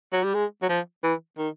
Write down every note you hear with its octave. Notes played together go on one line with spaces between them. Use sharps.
F#3
G3
G#3
F#3
F3
E3
D#3